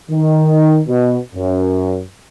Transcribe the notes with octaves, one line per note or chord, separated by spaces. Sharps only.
D#3
B2
F#2